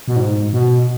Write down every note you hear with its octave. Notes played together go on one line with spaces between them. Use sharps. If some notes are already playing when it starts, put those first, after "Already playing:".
B2
G#2
B2